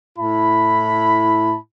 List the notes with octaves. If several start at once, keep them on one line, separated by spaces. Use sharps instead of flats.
A2 E4 A5 B5